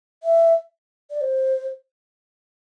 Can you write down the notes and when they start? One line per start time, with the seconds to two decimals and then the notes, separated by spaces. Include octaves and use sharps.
0.23 E5
1.11 D5
1.21 C5